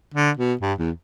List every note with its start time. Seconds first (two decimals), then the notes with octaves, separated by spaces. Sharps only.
0.14 D3
0.37 B2
0.61 G2
0.78 E2